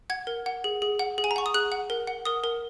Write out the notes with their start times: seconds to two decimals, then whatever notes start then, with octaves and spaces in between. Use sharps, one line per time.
0.10 F#5 G#6
0.27 A#4
0.46 F#5
0.64 G#4
0.82 G#4
0.99 F#5
1.18 G#4
1.24 G#5
1.31 A#5
1.36 F#5 C#6
1.46 D#6
1.54 G#4 F#6
1.72 F#5
1.90 A#4
2.07 F#5
2.25 A#4 D#6
2.44 A#4